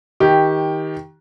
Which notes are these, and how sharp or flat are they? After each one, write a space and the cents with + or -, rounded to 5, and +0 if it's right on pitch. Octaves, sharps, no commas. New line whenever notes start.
D#3 +20 G4 +0